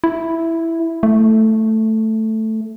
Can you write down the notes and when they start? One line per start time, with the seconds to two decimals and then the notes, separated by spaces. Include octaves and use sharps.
0.04 E4
1.03 A3